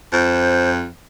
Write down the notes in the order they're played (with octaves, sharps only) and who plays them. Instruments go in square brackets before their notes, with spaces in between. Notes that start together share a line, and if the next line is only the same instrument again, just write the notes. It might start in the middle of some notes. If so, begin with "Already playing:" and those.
[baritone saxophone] F2 [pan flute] C5